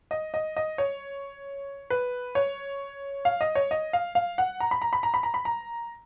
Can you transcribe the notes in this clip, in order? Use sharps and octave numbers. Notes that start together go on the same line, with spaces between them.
D#5
D#5
D#5
C#5
B4
C#5
F5
D#5
C#5
D#5
F5
F5
F#5
A#5
B5
A#5
B5
A#5
B5
A#5
B5
A#5